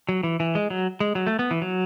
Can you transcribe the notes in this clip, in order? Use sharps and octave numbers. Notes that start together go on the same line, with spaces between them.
F#3
E3
E3
G#3
F#3
G#3
F#3
A3
B3
E3
F#3